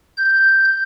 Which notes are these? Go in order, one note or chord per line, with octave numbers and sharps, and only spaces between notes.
G6